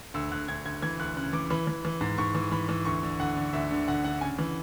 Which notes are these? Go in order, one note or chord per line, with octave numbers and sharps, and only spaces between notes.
D2 E6
D2 F#6
D2 G#6
D2 G#6
E3 G#6
D2 F#6
C#3 F#6
E3 D6
E3 B5
E3
E3
G#2
G#2 C#6
E3
E3 B5
E3
D2 C#6
D3
D2 F#5
D3
D2 E5
D3
D2 F#5
D3 F#5
C#3 G#5
E3